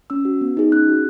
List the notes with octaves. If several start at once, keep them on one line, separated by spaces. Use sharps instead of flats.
C#4 E6
F#4
B3
D#4 G#4
C#4 F#6
F#4